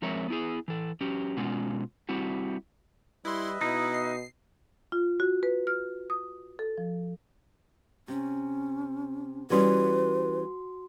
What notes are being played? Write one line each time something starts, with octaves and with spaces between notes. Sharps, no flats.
F3 G#3 C4 A#4 C#5 E5
B3 E4 G#4
E3 A4
F#3 C#4 G4
B2 G#3 B3 C#4 F4
G3 C4 E4 F#4
G3 E4 B4 D#5 E5 C6
B2 D#4 E4
C7
F4
F#4
B4
F6
D#6
A4
F3
C3 C#4
E3 G3 C#4 F#4 B4 C6